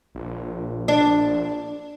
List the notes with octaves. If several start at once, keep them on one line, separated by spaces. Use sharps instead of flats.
A#1
D4